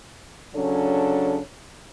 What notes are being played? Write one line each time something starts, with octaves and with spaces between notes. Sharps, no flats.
C#3 F#3 C#4 D4 A4 C#5